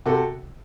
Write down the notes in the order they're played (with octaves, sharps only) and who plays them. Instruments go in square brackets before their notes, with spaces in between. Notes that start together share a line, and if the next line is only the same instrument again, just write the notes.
[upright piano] C3 F#4 A4